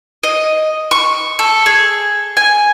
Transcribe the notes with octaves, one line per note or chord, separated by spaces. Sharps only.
D#5
C#6
A4
G#4
G#5